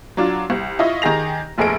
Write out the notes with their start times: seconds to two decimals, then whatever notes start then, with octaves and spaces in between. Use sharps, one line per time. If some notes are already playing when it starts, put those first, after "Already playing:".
0.17 F#3 D4 F4
0.50 C2
0.79 E4 F4 D#5 C#6
1.02 D#3 G4 G#4 A#6 F7
1.58 F1 A#1 G#4 A4 D#5 D7